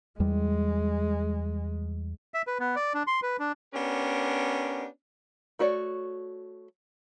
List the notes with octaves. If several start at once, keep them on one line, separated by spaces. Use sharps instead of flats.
E2 G3 G#3
E5
B4
B3
D5
D4
C6
B4
D4
B3 C#4 D4 G4 A#4
A3 F#4 C#5 D5